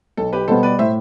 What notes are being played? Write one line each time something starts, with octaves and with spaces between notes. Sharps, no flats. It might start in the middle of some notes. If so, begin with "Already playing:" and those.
B1 A4
G4 B4
B2 G3 B3 A4 C5
B4 D5
A2 C5 E5